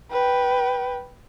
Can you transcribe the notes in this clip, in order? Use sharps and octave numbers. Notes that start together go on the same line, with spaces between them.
B4 G5